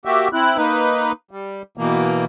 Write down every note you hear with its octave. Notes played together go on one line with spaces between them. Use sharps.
A#3 F#4 G4 E5
C4 E4 F#6
A#3 D#4 B4
G3
B2 E3 A#3